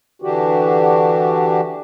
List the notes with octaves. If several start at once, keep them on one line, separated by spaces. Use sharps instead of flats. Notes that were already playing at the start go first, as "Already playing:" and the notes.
D3 E3 D4 F#4 G4